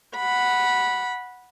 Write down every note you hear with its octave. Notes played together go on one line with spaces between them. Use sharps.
F#5 B5